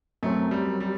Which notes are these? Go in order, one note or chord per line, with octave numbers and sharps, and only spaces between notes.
F#2 F#3 A3 C4
G3
G3